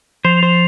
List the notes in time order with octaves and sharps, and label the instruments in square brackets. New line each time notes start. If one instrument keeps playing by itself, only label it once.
[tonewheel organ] F3 [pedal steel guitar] C5
[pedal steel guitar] C5